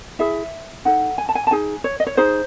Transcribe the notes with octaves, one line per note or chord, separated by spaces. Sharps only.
E4 G#4 E5
D#4 A4 F#5
G#5
A5
G#5
A5
D#4 G#4 G#5
C#5
D#5
C#5
D#4 G#4 C5